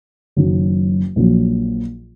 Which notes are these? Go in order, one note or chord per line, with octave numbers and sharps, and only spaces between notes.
F#1 F#2 D#3 F#3
A#1 A#2 F#3